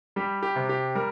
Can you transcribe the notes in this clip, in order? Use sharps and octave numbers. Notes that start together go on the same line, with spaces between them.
G3 G4
G4
C3
G4
G3 A#4